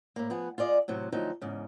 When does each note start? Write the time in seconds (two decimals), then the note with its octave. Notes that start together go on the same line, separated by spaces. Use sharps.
0.16 A2 A#3
0.30 F3 B3 G#4 F#5
0.58 F4 G#4 D5 D#5
0.88 A2 C3 F#3
1.12 D2 F3 F#3 D#4
1.41 E2 G#2 C#3